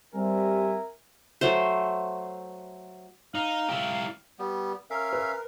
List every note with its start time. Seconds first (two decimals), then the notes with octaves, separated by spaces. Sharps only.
0.15 G3 C4 A#4 E5 G#5
1.41 F#3 A3 C5
3.35 D#4 F5
3.69 E4 G4
4.39 G3 B3
4.90 C#4 A#4 E5 F5
5.13 B4